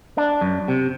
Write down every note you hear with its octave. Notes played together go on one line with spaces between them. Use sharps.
D4
F#2
C3